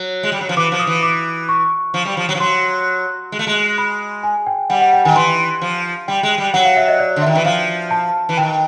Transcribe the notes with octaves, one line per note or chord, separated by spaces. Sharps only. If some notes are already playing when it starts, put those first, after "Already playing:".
Already playing: F#3
G#3
G3
F#3
F3
E3 D6
F3
D#6
E3
D6
C#6
F3
G3
F3
F#3
F3
F#3 C6
G#3
A3
G#3
B5
G#5
G5
G3 F#5
F#5
G5
D#3 G#5
E3 C6
F3
G3 G5
G#3
G3
F#3 F#5
F5
E5
D#5
D5
D3
D#3 E5
E3
F3 F5
A5
E3
D#3 G5